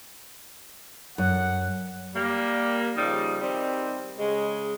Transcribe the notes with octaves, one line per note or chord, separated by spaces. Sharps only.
F#2 F#5
G3 A#3
C#3 F3 G3 D#4
D#3 G3 C4
C#3 G#3